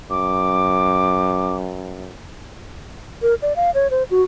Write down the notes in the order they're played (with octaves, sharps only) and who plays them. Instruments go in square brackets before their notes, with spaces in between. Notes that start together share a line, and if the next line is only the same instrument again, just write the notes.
[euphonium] F#2 [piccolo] D6
[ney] A#4
D5
F5
C#5
C5
F#4